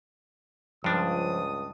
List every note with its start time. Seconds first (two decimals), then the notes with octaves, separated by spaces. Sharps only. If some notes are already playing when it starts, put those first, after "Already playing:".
0.84 C#2 G2 F3 D4 D#6